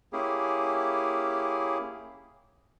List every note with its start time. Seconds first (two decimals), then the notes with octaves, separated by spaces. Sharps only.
0.13 A#3 C#4 E4 G4 G#4